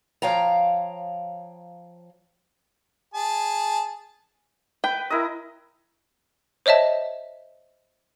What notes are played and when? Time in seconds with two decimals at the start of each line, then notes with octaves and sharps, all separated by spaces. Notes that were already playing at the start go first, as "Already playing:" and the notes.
0.22 F3 C#5 F5 G5 A#5
3.14 G#4 A5
4.84 B4 G5
5.10 E4 A#4 D#5
6.66 C5 C#5 D#5 E5 A5